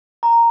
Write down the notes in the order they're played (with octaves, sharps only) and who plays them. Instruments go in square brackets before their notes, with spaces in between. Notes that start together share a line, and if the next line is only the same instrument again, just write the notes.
[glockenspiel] A#5